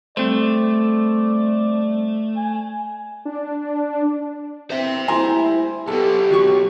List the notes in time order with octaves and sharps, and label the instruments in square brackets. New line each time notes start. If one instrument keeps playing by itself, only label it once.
[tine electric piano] G3 C4 C5 [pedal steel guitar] A3 [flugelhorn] D5
[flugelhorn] G#5
[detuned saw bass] D4
[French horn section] E3 A#3 C4 [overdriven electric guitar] C5 E5
[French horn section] D2 G3 E4 [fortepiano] G#5 A#5 C6
[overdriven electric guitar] B1 B2 [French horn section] G4 [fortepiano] A4
[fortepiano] F#3 C#6